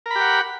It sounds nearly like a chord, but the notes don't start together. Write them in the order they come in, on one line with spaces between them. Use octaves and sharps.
A#4 B5 G4 F#5